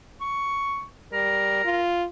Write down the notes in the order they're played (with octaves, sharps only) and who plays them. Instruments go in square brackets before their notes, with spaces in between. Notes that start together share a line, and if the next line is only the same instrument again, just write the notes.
[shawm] C#6
[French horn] G3 [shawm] A#4
[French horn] F4